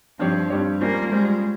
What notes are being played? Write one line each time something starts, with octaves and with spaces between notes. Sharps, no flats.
G2 F3 G3 C4 G4 C#5
G2 G3 C4 G4 C#5
G3 A#3 C#4 F4 C5
G3 G#3 C#4 F4 C5